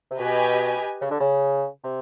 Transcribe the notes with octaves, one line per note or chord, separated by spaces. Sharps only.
C3
B2 G4 B4 D#5 G#5
C#3
D3
C#3
C3